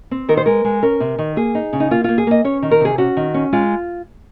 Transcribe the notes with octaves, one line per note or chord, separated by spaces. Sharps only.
C4
D#3 A#4
C5
G#3 A#4
G#3
C#4 A#4
C3
D#3
A#3 G#4
D#4
C#3
D#4
A#3 F4
A#3 F4
G#4
A#3 D#5
C#4 C#5
D#3
A#4
C3 G#4
C#4 F#4
D#3
C#4
G#3 F4